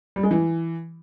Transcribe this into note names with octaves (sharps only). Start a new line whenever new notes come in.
G3
G#3
E3